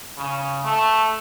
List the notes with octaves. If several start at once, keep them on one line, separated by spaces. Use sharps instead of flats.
C#3
A3